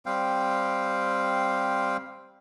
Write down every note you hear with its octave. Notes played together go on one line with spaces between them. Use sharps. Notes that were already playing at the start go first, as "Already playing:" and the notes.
G3 C4 F5 G5